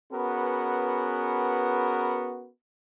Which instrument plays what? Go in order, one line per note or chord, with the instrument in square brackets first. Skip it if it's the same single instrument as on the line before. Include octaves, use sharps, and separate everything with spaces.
[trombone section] B3 C#4 F#4 G#4 A#4 B4